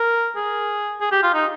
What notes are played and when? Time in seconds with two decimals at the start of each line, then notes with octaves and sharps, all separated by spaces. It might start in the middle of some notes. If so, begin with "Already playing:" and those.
Already playing: A#4
0.36 G#4
1.01 G#4
1.12 G4
1.23 F4
1.34 D#4